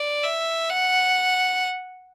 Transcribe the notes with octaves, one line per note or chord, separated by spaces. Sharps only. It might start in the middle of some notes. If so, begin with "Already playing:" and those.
Already playing: D5
E5
F#5